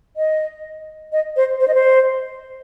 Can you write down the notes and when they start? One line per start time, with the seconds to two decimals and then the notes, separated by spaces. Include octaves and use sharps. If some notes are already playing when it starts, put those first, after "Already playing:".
0.16 D#5
1.12 D#5
1.36 C5
1.60 C5
1.68 D#5
1.74 C5